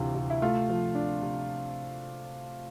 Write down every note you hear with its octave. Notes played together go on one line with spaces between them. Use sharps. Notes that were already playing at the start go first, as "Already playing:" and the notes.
Already playing: D2 C3 E3 F4
C3
E4
A3 F4
F3
D4
C3